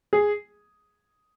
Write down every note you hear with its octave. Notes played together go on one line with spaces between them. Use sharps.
G#4